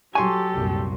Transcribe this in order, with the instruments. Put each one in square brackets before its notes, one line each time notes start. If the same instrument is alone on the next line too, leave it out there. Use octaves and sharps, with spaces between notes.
[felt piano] F#3 C6 C#6 [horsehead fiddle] G4 A4 [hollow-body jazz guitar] G#5
[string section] C2 F#2 A#2